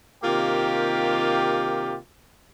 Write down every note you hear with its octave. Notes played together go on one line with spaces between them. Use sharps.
C3 D#3 A#3 F4 G4